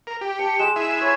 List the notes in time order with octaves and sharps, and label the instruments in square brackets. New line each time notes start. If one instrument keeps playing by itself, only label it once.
[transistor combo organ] A#4
G4
[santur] A5 [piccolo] C#7
[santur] G#3 [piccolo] E7
[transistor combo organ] E4 G#4 E5
[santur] C#5 B5 [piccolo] G#6